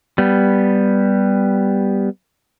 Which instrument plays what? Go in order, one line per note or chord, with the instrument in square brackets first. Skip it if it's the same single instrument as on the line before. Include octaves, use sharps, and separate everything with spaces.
[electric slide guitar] G3 B3